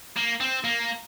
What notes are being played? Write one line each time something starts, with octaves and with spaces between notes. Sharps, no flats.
A#3
C4
A#3